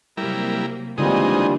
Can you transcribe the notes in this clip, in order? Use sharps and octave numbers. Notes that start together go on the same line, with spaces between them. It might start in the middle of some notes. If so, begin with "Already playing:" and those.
C3 F#3 G3 A#3 E4 A#4
D3 E3 G3 G#3 A#3 C4 D#4 F4